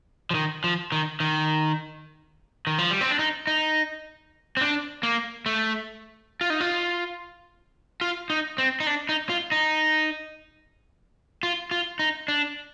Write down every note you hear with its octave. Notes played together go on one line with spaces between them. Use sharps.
F3
D#3
F3
D#3
D#3
D#3
F3
G3
C4
D4
D#4
D#4
C4
D4
A#3
A3
F4
D#4
F4
F4
D#4
C4
D#4
D4
D#4
F4
D#4
F4
F4
D#4
D4